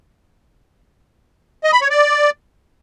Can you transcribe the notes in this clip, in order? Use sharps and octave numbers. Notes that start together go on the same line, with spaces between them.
D#5
B5
C#5
D5